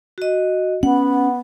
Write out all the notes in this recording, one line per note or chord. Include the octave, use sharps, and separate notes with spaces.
F#4 D#5
B3 C#4 F#5